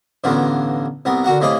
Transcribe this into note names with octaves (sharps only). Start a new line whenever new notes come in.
A1 G2 D3 B3 F4 A#4
C2 B3 A#4
D3 F#4 A#4 F#5
A2 C3 A#3 G#4 D#5 B5